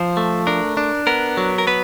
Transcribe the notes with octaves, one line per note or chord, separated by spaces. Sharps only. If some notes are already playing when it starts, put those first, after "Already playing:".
Already playing: F3 C5
A3
D4 A#4
D4
B3 A#4
F#3
A#4
B3 B4